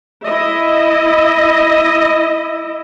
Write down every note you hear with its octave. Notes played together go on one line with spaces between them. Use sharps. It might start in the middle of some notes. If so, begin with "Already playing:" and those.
E4 D#5 E5